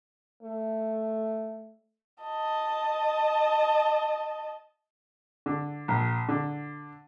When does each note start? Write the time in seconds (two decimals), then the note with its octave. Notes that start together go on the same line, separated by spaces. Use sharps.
0.43 A3
2.24 D#5 A5
5.46 D3
5.88 A#1
6.29 D3